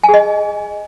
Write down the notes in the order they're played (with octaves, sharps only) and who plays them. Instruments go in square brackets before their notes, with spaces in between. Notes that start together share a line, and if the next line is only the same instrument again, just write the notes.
[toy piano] G#5
G#4
D#5